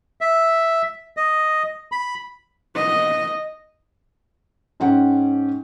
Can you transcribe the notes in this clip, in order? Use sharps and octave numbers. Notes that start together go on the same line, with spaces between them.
E5
D#5
B5
D#5
G#2 C#4 F#5 G5